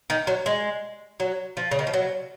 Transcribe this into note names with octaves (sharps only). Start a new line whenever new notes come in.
D#3
F#3
G#3
F#3
F3
C#3
D#3
F3
F#3